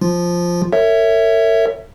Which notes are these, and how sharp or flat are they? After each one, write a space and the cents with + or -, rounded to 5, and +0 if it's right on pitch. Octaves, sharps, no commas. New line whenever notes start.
F3 +0 F4 +0
A#4 -45 C#5 +0 E5 +0